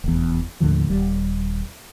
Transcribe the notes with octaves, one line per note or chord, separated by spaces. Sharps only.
F1 E2
D#2 A2 D3 F3
D#1 G3